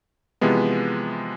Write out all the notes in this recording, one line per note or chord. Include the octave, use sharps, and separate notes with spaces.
C3 E3 F3 G#3 B3